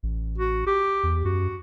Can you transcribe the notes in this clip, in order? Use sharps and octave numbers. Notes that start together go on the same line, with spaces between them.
A1
F#4
G4
E2
F#2 F#4